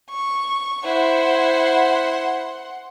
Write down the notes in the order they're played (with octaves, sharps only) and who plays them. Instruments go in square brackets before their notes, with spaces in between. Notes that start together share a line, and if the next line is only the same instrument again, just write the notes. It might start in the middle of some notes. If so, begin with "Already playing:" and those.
[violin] C#6
[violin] E4 C5 [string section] F#5 C6